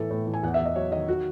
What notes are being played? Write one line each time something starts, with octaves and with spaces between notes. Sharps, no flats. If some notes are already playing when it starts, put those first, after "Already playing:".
Already playing: A2 E3 A4
A2
E3
G#5
E2 F#5
E5
E2
D#5
F#3 C#5
D#3 D#5
F#4